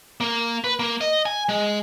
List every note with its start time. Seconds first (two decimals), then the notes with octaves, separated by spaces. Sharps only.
0.21 A#3
0.64 B4
0.80 A#3
1.01 D#5
1.26 G#5
1.49 G#3